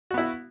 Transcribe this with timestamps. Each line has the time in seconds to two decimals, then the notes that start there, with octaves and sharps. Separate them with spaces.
0.11 F#4
0.14 B3
0.18 E4